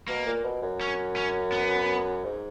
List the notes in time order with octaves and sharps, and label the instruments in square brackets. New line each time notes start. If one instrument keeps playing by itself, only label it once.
[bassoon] B2 [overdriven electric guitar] A#3
[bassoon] A#2
B2
F#2
[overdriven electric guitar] C#4
C#4
B3
[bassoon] G#2